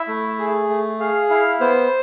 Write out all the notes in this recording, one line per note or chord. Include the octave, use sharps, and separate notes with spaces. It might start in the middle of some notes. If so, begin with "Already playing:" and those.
Already playing: E4 E5
A3
G#4
A3
G#4 F5
E4 F5
B3 C5